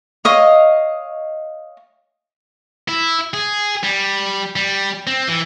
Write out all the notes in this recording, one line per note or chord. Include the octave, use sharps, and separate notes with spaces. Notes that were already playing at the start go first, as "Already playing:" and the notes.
C#5 D#5 F5 D#6
E4
G#4
G3
G3
C4
E3